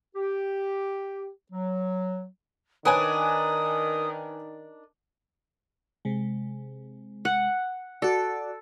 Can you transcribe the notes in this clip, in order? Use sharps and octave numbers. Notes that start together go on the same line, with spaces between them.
G4
F#3
D#3 D4 D#4 A#4 B4 C#5 G#5 D#6
C3 G#3
F#5
F#4 A4 D5